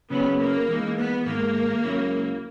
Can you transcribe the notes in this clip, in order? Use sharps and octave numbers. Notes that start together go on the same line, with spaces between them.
C#3 F#3 B3 C#4 G#4 B4
A#3
E3 G#3 D#4
B3
G#2 D#3 G#3 A#3
C#2 C#3 F#3 C#4 E4